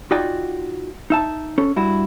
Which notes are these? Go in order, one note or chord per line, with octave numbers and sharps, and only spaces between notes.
D#4 F4 F#4 D5 G5 G#5
D#4 E5 A5
C#4 A4
G2 E4 F#4